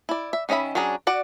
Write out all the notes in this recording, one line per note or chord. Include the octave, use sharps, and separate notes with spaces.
E4 D5
E5
D#3 C#4 D#5 E5 B5
F#3 C#4 D4 G#4 A#5
F#4 D5 F#5